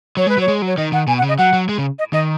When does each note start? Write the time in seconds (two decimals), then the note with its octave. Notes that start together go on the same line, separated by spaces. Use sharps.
0.17 F#3 C#5
0.27 G#3
0.29 B4
0.38 F#3
0.41 C#5
0.48 G#3
0.62 F#3 C#5
0.78 D#3 D#5
0.92 D#3 F#5
1.07 B2 G#5
1.18 F#5
1.23 C#3
1.29 D#5
1.38 F#3 F#5
1.53 F#3
1.69 G#3
1.78 C#3
1.99 D#5
2.13 D#3 D#5